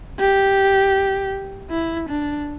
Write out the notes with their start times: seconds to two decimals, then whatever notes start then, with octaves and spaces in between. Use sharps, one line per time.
0.20 G4
1.71 E4
2.09 D4